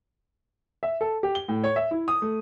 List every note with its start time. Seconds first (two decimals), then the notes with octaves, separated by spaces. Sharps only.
0.83 E5
1.01 A4
1.23 G4
1.35 G7
1.48 A2
1.64 C#5
1.76 E5
1.91 E4
2.08 D#6
2.22 A3